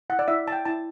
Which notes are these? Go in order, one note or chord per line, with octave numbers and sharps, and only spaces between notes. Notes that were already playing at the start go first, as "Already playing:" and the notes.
E4 F#5
D5
E4 E5
C#5 A5
G5
E4 A5